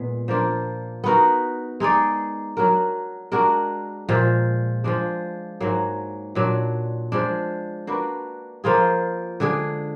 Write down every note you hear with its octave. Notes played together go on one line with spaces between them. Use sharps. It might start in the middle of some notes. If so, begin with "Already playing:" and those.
Already playing: A#2 G#3 B3
F3 A#3 D4 F4
B3 D#4 F#4 A#4
G#3 D#4 G#4 D5
F#3 D4 F#4 A#4
G#3 D4 F#4 A#4
A#2 F3 G#3
F3 G#3 D4
G#2 F#3 A#3
A#2 F#3 D4
F3 G#3 D4
A#3 D4 F#4 B4
F3 A#3 F4 G#4
D3 G#3 D4 G#4